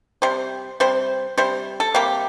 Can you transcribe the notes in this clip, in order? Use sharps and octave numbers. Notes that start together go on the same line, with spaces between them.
C3 G3 C5
C3 G3 C5
C3 G3 C5
A4
C3 G3 A#3 G4